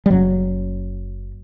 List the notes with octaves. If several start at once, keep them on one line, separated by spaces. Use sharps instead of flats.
G3
F#1 F#2 C#3 F#3